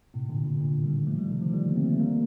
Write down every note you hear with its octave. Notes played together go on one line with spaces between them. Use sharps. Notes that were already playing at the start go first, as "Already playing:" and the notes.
A2 C3
A#2 D3
A#2 D3
A#2 D3
D#3 G3
G3
F3 A3
D#3 G3
C3 D#3
D3 F3
D#3 G3
A#3
A3 C4
A3
G3 A#3